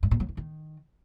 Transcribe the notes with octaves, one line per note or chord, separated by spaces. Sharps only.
G2
A#2
F#3
E3
D#3